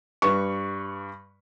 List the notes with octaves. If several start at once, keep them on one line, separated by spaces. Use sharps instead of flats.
G2 B4 C#6